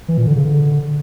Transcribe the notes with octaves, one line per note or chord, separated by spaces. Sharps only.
E3
A#2
D3
C#3
D3